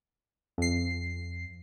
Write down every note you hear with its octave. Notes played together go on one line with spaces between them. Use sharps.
F2 C7